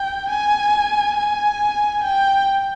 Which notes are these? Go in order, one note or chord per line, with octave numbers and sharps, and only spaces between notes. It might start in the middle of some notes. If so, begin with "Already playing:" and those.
Already playing: G5
G#5
G#5
G5